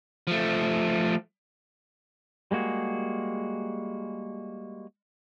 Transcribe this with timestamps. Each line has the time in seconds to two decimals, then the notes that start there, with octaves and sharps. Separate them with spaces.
0.27 F3 A3
2.51 G3 G#3 A#3 F#4 G#4